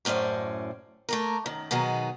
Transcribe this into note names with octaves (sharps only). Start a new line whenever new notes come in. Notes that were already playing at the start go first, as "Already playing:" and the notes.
F#2 A2 C#4 C5 D5
A3 A#3 A#4
F#2 D#3
B2 D#3 F#3 B3 G#4